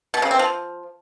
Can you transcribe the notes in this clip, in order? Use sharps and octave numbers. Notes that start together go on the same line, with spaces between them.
B2
C#3
C4
F3